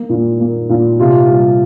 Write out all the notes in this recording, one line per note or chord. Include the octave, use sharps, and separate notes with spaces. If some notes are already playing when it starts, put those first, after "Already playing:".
Already playing: A#3
A#2
A#3
A#2
C3 F4
G3